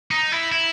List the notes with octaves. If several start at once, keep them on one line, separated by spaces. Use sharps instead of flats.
D#4
E4
E4